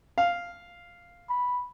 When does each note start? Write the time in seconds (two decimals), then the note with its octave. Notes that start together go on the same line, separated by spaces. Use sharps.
0.18 F5
1.29 B5